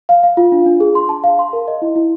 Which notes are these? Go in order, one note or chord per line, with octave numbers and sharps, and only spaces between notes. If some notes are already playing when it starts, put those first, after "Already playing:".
F5
F5
F4
D4
D4
G#4
C6
A5
F5
C6
A#4
D#5
E4
E4